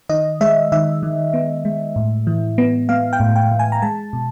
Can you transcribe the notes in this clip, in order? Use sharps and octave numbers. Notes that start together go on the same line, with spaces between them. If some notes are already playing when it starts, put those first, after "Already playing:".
D#3 D#5
G#3 E5
D#3 E5
D#3
B3
G#3
A2
E3
B3
B3 F5
G5
A2
G5
A2
G#5
A#5
G#3 A5
B2